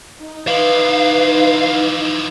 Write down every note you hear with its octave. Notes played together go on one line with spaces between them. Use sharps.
D#4
E3 F3 B4 F5